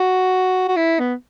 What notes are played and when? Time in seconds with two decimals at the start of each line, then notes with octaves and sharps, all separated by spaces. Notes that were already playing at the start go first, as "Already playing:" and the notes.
Already playing: F#4
0.68 F#4
0.76 E4
0.99 B3